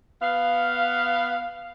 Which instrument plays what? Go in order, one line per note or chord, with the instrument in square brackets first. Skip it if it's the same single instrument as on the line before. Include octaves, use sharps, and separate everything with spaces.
[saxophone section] B3 F5